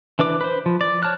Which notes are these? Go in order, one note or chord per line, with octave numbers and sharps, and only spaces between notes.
E3 D4 B4 D6
B4 C5
F3
D5
C#5 A5 F6 F#6